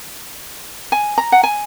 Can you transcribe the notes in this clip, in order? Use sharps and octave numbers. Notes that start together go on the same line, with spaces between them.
G#5
A#5
F#5
G#5